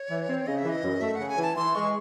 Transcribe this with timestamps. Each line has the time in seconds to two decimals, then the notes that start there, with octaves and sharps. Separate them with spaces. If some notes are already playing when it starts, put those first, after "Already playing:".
Already playing: C#5
0.10 E3
0.28 C4
0.46 C#3 D#5
0.58 E5
0.64 E3 D#5
0.83 F#2
1.01 A3 E5
1.15 C#3 F#5
1.29 G#5
1.37 E3 A5
1.56 E3 C6
1.75 G#3 C#6